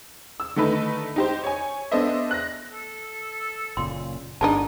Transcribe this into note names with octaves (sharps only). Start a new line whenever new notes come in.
E6
D3 D#3 A3 D#4 B4
D#4 G4 C5
C#5 G#5
B3 D4 A4 C5 D#5 E5
F#6 A#6
A4
F#1 A#2 C#3 C6
G1 G#3 D4 D#4 A5